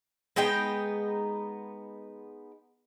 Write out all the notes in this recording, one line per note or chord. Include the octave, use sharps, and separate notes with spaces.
G#3 B3 D#4 G5